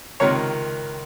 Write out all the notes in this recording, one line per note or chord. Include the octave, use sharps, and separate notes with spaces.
C#2 C3 D#3 A#4 C#5